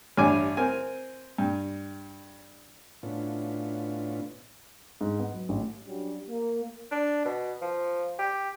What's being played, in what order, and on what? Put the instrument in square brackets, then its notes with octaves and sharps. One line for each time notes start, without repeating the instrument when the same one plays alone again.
[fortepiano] A1 G2 D4 G#5 D6
C4 A#4 G#5
G2
[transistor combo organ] A2 B3 C#4 D4 F4
[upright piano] G#2
B3
F#3
A1
[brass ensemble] F#3 G3 C#4 D4 F#4 G4
A#3
[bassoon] D4
B2
F3
G4